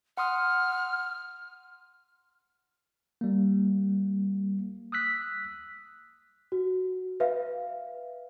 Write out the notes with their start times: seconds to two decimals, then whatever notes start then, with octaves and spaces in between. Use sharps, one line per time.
0.17 F#5 C6 D#6 F6
3.21 G3 A#3
4.92 D#6 E6 F#6 B6
6.52 F#4
7.20 B4 E5 F5